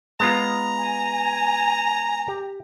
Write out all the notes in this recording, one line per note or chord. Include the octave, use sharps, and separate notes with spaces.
G#3 B3 F4 A#5
G#5
G4